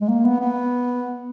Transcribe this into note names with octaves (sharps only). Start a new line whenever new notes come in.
G#3
A#3
B3
B3